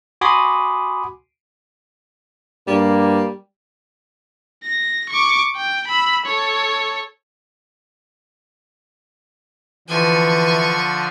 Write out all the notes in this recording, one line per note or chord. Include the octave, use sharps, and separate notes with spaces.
F#4 G#5 B5 C6 D6 D#6
G2 G3 A#3
A#6
C#6 D6
G5
B5 E6
A4 C#5
D3 E3 F3 G#5 C#6